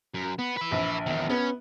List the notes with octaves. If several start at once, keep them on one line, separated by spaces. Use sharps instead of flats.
F#2
B3
B4 E5
A#1
E2 D#3
B3 C#4